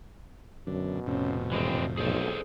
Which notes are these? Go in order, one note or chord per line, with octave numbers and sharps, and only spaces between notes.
F#2 B2 D3
F2 A2 C3 C#4
E1 E3 G#3 C4
F1 B1 G#4 A4 C5